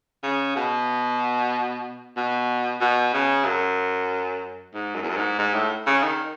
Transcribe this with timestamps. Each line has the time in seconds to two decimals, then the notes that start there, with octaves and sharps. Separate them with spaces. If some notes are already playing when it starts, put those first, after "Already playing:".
0.23 C#3
0.56 B2
2.17 B2
2.81 B2
3.14 C#3
3.45 F#2
4.74 G#2
4.95 F#2
5.02 E2
5.10 F#2
5.17 G#2
5.39 G#2
5.54 A2
5.87 C#3
6.03 D#3